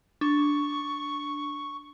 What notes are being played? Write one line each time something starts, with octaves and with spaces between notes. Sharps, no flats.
D4 C#6